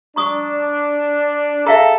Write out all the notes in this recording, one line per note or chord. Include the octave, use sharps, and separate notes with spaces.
D4 A#5 C#6 D#6
G#4 A4 E5 F5 A#5